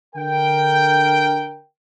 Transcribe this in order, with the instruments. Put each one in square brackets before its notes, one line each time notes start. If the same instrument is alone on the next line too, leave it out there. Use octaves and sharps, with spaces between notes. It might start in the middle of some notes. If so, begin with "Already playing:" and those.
[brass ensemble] D3 A#4 G5